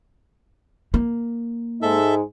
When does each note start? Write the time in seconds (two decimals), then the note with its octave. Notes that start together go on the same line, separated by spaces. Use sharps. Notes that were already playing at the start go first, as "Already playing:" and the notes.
0.94 A#3
1.82 G#2 G#3 D#4 A4 E5